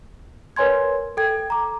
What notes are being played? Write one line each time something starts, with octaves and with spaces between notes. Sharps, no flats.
A#4 B4 C#5 G#5 C6 G#6
A4 G5 G#6
A#5 D6